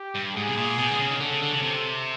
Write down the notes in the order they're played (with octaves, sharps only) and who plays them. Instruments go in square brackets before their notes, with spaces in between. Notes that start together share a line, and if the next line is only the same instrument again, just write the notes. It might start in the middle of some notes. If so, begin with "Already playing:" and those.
Already playing: [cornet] G4
[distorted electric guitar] G2
[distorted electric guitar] G#2 [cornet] G#4
[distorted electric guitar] B2
A#2
B2
D3
C#3
D#3
[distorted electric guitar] D3 [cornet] A4
[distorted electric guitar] C#3
D3
C#3
C3